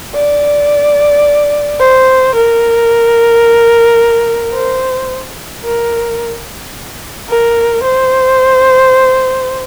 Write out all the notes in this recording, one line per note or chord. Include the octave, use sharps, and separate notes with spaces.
D5
C5
A#4
C5
A#4
A#4
C5